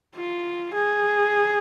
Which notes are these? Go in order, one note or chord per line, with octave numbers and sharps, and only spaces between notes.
F4
G#4